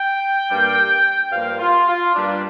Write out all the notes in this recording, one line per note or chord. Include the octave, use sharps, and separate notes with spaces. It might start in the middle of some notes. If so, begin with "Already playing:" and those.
Already playing: G5
G2 G3 A#3
G2 F3 A#3 F5
F4
F4
G2 G3 A#3 D4